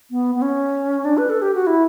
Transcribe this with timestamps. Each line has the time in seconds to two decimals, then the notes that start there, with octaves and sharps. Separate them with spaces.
0.11 B3
0.35 B3
0.42 C#4
1.05 D4
1.18 B4
1.30 A4
1.42 G4
1.55 F#4
1.67 E4